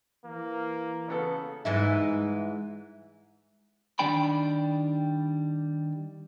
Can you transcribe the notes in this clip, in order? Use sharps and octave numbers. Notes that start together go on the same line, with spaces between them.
E3 A#3
C#3 B3 A4
G#2 E3 E4
D#3 G3 D4 D5 G5 B5